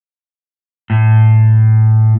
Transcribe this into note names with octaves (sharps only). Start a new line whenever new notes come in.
A2